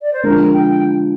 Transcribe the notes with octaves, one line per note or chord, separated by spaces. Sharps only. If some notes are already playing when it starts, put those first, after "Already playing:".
D5
C5
D3 F3 G#3 D4 A#4
G5